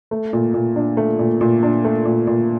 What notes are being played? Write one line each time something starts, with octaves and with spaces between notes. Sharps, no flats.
A3
A#2
A#2
D4
A3
A#2
A#2
D4
A3
A#2
A#2